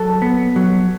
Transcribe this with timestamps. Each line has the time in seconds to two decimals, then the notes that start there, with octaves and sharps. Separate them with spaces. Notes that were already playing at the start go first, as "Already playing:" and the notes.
Already playing: F#3 A4
0.22 B3
0.56 F#3